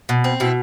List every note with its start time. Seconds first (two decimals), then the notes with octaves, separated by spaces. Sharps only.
0.09 B2
0.24 C4
0.40 B2 E4